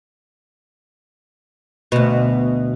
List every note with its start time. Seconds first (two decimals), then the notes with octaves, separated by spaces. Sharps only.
1.92 D2 B2